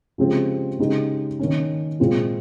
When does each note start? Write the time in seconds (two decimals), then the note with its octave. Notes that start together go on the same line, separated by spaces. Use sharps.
0.18 C#3 F3 G#3 C4 G4
0.79 C#3 G#3 D#4 G4
1.39 D#3 A#3 C#4
2.00 A#2 G#3 C4 F4